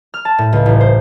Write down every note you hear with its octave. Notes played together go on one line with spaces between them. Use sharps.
F6
A5
A2
C#2
A1
C5